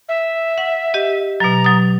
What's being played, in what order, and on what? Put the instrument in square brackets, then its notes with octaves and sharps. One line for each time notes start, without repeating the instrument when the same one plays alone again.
[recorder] E5
[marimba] F#5
G4 D#5
[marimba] B2 F#3 [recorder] A#5
[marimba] F#3 D#6